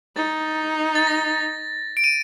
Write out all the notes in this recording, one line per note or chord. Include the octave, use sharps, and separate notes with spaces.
D#4 A6
A6
A#6
D7
D#7